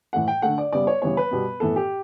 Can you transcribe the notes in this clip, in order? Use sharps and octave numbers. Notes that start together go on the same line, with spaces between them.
A2 E3 A3 F#5
G5
D3 A3 F#5
D5
C#3 G3 B3 D5
C#5
C#3 E3 G3 B3 C#5
B4
B2 G3 B3
A2 E3 B3 A4
G4